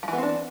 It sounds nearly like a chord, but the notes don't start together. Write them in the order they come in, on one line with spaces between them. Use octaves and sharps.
F3 E3 B3 C4 D4